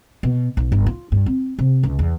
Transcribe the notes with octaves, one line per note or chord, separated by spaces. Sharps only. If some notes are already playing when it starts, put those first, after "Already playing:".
B2
B1
G1
F4
G2
C4
C3
C#2
E2